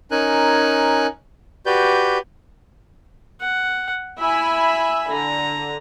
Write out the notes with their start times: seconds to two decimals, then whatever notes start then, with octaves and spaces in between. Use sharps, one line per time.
0.11 C#4 D#4 A#4 G#5 F#6
1.66 F#4 G4 B4 D5 G6
3.41 F#5
4.19 E4 E5 G#5 B5
5.12 D3 A#5